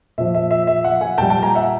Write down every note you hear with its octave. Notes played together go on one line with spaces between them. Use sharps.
A#2 F3 E5
E5
E5
E5
E5 F#5
F#5 G#5
A#2 G3 G5 A5
G5 A5
G#5 A#5
E5 F#5